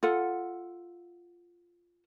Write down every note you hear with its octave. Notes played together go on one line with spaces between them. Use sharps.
F4 A4 F#5